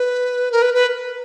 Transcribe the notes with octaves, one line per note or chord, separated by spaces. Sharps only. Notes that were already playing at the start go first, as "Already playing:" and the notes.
Already playing: B4
A#4
B4
B4